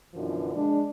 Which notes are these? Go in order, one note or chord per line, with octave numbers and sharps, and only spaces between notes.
F#2 B2 D3 E3 F3
G#3 D4